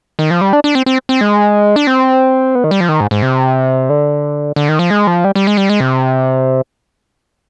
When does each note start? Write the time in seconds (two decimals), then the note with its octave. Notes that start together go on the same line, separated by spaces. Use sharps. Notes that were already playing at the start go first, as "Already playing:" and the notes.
0.19 D#3
0.31 F3
0.41 G3
0.53 D4
0.64 D4
0.75 C4
0.86 C4
1.09 C4
1.21 G#3
1.76 D4
1.87 C4
2.55 B3
2.64 D#3
2.71 G3
2.80 F3
2.89 D#3
3.00 G#2
3.11 G#2
3.22 C3
3.89 D3
4.56 D3
4.69 D#3
4.79 F3
4.91 G#3
5.07 F3
5.24 G3
5.35 G3
5.47 G#3
5.57 G3
5.69 G#3
5.80 C3